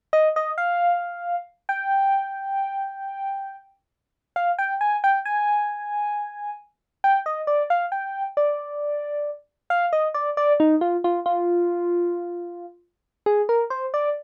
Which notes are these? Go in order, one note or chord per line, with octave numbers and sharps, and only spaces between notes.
D#5
D#5
F5
G5
F5
G5
G#5
G5
G#5
G5
D#5
D5
F5
G5
D5
F5
D#5
D5
D5
D#4
F4
F4
F4
G#4
A#4
C5
D5